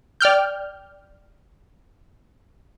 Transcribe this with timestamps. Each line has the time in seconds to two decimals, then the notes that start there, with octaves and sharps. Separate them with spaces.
0.21 D5 G5 F6 G6